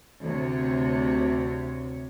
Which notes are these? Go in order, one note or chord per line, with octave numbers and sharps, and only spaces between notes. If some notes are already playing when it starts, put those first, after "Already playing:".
D2 C3 C#5